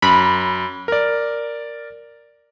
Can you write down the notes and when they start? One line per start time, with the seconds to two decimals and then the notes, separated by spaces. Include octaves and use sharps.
0.02 F#2 B5
0.88 A#4 D5